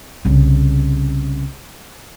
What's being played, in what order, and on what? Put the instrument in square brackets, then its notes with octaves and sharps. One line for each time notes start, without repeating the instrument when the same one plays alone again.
[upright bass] C2 C#3